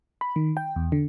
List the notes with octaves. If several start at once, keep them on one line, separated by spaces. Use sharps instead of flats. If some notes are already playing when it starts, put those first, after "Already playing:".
B5
D#3
G5
E2
D3